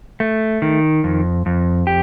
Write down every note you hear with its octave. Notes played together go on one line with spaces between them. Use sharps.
A3
D#3
F2
F2
G4